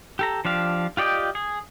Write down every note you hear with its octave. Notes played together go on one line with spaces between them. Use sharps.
G4 A4 A#5
F3 D4 G4 F5
F4 G4 D5 D#5 G5
G#4